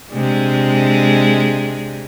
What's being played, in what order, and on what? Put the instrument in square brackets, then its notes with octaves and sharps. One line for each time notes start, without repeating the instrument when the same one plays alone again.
[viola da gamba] C3 G#3 D4